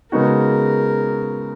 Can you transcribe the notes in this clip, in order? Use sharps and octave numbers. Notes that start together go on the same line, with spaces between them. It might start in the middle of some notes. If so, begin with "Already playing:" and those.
C#3 G#3 B3 D#4 F#4 A#4